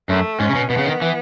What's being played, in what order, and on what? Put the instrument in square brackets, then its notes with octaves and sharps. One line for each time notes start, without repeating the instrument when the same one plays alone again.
[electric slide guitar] F#2 [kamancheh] A3
[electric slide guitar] G#2 [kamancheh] C#4
[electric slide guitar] C#3
B2
[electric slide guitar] B2 [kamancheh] B3
[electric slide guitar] C#3
D#3
E3